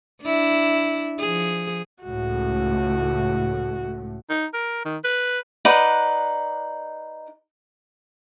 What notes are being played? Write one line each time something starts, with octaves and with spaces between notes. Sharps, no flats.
D4 E4
F3 G#4
C#2 A2 A3 F#4
D#4
A#4
D#3
B4
D#4 B4 D5 F#5